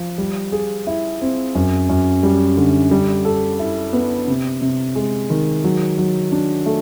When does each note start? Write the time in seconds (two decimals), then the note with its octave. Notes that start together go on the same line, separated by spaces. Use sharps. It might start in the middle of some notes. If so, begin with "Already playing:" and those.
Already playing: F3
0.18 G3
0.52 G#4
0.87 E4
1.21 C4
1.55 F#2
1.89 F#2
2.23 G3
2.57 D3
2.91 G3
3.25 A4
3.59 E4
3.93 B3
4.28 C3
4.62 C3
4.96 G#3
5.30 D#3
5.64 F#3
5.98 F#3
6.32 D4
6.66 A3